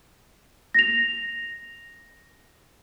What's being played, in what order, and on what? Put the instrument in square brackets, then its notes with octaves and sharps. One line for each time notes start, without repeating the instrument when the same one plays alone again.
[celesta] A#6 F7